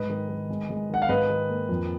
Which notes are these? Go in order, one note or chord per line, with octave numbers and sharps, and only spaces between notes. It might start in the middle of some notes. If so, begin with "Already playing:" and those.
Already playing: G#2 B4 D#5
D#3
D#3
G#3
G#3
D#3 F#5
F5
G#2 B4 D#5
D#3
A#3
F2